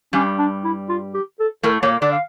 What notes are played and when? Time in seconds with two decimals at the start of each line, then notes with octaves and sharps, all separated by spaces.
0.13 G2 G3 C#4
0.38 D4
0.64 E4
0.89 F4
1.14 G4
1.40 A4
1.63 A2 A3 A#4
1.83 A#2 A#3 C#5
2.02 D3 D4 D5
2.12 F5